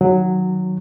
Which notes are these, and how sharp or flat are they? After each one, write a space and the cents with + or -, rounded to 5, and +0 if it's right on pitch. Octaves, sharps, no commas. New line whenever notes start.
D#3 +0 F#3 -5